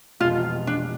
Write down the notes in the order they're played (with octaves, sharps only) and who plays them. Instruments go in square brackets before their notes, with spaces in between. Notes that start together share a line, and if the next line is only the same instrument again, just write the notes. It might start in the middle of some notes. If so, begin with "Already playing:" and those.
[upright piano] F1 E2 B2 G#3 [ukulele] F4
[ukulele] D4